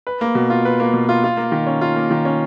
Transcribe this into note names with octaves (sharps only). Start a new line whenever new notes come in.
B4
A#3
B2
F4
B4
A#3
B2
F4
F4
A#3
D#3
C#4
F4
A#3
D#3
C#4